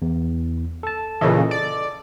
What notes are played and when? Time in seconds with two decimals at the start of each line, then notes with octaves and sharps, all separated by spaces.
0.02 E2
0.83 A4 A5
1.21 A#2 C#3 E3 A4 D#5
1.51 D5